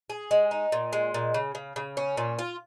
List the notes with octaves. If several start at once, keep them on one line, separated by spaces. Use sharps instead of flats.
G#4
G#3
D#4
A#2
G#3
A#2
C#3
C#3
C#3
C#4
A#2
F4